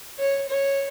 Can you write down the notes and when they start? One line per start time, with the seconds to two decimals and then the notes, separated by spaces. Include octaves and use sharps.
0.19 C#5
0.49 C#5